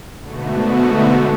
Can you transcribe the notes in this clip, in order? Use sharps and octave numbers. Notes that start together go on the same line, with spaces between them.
G#2 B2 D3 A3 B3 F#4